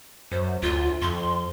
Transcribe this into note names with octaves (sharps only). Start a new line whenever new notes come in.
F#2 C5
D2 F4
F2 C6